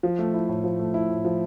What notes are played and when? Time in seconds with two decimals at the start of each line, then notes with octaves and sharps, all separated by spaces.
0.03 F3
0.19 A3
0.34 E4
0.49 A2
0.64 F3
0.79 A3
0.94 E4
1.09 A2
1.25 F3